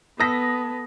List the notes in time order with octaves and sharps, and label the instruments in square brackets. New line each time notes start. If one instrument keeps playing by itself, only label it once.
[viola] B3 [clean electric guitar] A4 [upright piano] D#6 A#6 B6